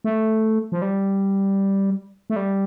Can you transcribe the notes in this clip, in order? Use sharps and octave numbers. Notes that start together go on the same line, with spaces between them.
A3
F3
G3
A3
G3